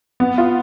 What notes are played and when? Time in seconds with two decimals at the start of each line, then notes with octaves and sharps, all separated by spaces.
0.20 B3
0.38 F4